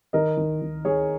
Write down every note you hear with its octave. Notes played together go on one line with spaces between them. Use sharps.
D#3 A#4 D#5
D#3
D#3
D#3 G#4 C#5